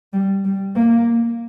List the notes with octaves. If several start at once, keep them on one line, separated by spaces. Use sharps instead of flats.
G3
G3
A#3